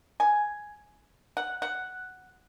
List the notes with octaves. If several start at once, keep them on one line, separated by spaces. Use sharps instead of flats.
G#5
F#5
F#5